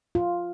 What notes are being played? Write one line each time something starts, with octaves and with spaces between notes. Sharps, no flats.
F4